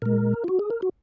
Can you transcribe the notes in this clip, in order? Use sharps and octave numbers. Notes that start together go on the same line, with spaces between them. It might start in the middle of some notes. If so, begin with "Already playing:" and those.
A#2 G#3 A#4
F4
F#4
G#4
A#4
F#4